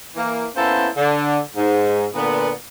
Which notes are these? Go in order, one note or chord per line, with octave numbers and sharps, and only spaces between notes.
E3 A#3
A#3 B3 C#4 E4 A4 C5
D3
G#2
A#2 D3 B3